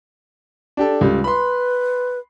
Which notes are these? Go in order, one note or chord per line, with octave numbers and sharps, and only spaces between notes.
D4 G4 A4
C#2 G3
B4 B5 C6